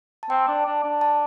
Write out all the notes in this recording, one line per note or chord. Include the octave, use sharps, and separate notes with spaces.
A5
C4 G5
D4
D4
D4
A5